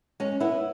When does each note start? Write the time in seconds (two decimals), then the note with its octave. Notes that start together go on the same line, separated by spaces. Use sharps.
0.20 G#3 C#4
0.40 B3 E4